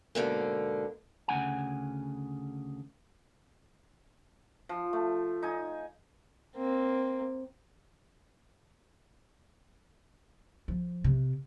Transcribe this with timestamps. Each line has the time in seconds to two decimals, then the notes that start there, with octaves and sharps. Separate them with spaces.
0.15 G#2 B2 D3 A#3
1.28 D2 C#3 C4 F#5 G#5
4.69 F3
4.93 A3
5.43 D#4 G#5
6.56 A#3 C4
10.68 F3
11.04 C3